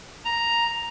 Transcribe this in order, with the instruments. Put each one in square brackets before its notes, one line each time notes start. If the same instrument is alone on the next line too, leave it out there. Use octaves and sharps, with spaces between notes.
[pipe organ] A#5